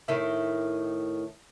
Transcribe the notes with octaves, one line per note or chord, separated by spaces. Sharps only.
A2 D#3 E4